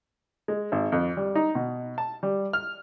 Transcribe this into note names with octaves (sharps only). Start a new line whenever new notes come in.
G#3
G#1
F2
G3
D#4
B2
A5
G3
F6